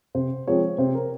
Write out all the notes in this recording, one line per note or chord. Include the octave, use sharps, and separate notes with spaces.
C3 C5
F3 G#3 C4 C#5
C3 C5
A#4